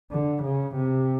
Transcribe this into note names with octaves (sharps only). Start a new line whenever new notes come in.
D3
C#3
C3